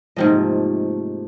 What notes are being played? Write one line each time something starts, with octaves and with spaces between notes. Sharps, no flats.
G#2 C3 F3 A3 A#3 D#5